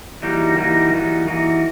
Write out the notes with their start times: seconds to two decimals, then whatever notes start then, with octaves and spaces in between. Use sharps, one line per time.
0.22 E3 G3 A#3 D#4 F#4
0.57 E3 G3 A#3 D#4 F#4
0.92 E3 G3 A#3 D#4 F#4
1.27 E3 G3 A#3 D#4 F#4